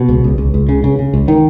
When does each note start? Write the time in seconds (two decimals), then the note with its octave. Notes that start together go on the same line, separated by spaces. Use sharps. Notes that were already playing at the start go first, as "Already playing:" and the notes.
Already playing: B2
0.08 C#2 B3
0.24 C#2
0.38 C#2
0.54 C#2
0.69 C#3
0.84 C#3
0.99 C#3
1.14 C#2
1.28 D#3